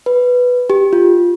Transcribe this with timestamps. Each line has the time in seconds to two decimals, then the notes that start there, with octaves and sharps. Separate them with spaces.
0.06 B4
0.70 G4
0.93 F4